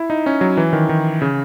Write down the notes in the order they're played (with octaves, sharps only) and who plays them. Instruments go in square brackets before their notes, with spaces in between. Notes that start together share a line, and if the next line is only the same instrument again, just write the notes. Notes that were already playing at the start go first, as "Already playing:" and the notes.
Already playing: [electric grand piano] E4
D#4
C#4
F#3
E3
D#3
D#3
C#3